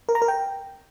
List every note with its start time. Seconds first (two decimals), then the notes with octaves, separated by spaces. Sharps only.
0.09 A#4
0.15 A#5
0.22 A#4
0.28 G5